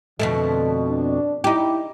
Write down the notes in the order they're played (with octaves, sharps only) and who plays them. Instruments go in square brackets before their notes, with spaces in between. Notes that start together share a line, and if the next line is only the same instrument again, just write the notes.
[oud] F2 B2 A3 [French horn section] D3
[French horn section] D4
[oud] D#4 G4 [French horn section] E4